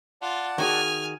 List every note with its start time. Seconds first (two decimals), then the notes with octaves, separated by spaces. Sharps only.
0.22 F4 D5 F#5 A5
0.58 D#3 F#4 G#4 G#5 F6